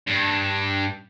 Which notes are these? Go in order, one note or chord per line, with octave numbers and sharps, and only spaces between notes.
G2